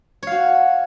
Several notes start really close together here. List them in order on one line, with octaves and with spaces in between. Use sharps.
C#5 F5 F#4